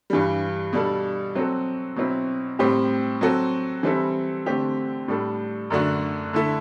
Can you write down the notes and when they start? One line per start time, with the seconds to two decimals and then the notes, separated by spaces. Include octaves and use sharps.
0.10 G2 E3 G3
0.73 B2 G3 D4 A4
1.35 F#3 C4 F#4 A4
1.96 B2 F#3 C4 E4
2.59 A2 G3 C4 G4
3.21 F#3 C4 F#4 A4
3.83 E3 G3 C4 E4 A4
4.46 D3 A3 C4 G4
5.08 A2 G3 D4 A4
5.70 F#2 D3 A3 D4 F#4
6.33 D3 A3 E4 A4